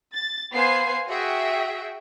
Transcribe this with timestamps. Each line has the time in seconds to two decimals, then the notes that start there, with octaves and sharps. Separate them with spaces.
0.14 A6
0.54 B3 C5 F5 G#5 C7
1.09 F#4 G#4 E5 G5